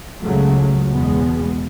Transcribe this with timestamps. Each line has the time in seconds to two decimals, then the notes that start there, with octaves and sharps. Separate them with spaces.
0.23 C#2 C#3 F#3 A3
0.89 E2 B2 G#3 B3